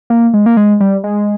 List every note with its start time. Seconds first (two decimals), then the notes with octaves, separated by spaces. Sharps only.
0.10 A#3
0.34 G#3
0.46 A#3
0.57 G#3
0.80 G3
1.04 G#3